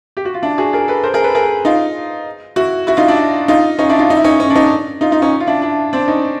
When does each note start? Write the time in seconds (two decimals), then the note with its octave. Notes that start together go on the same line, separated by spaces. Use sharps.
0.17 G4
0.25 F#4
0.34 F4
0.42 D4 E4
0.58 F#4 G#4
0.73 G#4 A#4
0.88 A4 B4
1.03 A#4 C5
1.14 G#4 A#4
1.24 A4 B4
1.35 G#4 A#4
1.65 D#4 F4
2.56 E4 F#4
2.87 E4 F#4
2.97 D#4 F4
3.08 D4 E4
3.48 D#4 F4
3.79 C#4 D#4
3.89 D4 E4
3.99 D#4 F4
4.10 D#4
4.17 E4
4.24 C#4 D#4
4.40 C#4
4.50 D4
4.56 C#4 D#4
5.01 D#4 F4
5.12 D#4 F4
5.22 C#4 D#4
5.40 F4
5.47 D4 E4
5.62 D4 E4
5.93 C4 D4
6.08 C#4 D#4